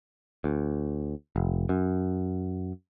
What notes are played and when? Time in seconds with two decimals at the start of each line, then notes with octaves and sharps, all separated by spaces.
0.44 D2
1.36 F1
1.69 F#2